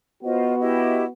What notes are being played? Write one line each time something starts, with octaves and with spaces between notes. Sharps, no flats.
B3 F4 F#4 C5 D#5
E4 G4 D#5